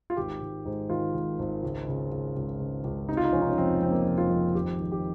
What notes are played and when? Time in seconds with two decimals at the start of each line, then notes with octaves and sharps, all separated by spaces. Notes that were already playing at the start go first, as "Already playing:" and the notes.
0.10 F4
0.17 G#1 G4
0.42 G#1
0.65 G#2
0.89 D#3 F4
1.14 G#1
1.39 G#1
1.63 C#2
1.88 C#3
2.11 C#2
2.36 C#2
2.60 C#3
2.84 C#2
3.09 C3 D#4
3.17 F4
3.25 D#4
3.33 F1 C#4
3.41 D#4
3.49 C#4
3.58 F2 C4
3.81 F3 C4
3.92 A#3
4.02 F1 C4
4.18 F4
4.30 F2
4.55 G#1 G4
4.80 D#3
4.92 G4